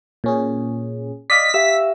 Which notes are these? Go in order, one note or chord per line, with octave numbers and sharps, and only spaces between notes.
A#2 C#4 G#4
D5 D#5 F5 B6
G4 E5 F5 E6